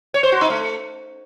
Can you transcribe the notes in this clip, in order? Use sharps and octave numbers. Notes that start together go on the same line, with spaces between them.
C#5
C5
F#4
D#4
A3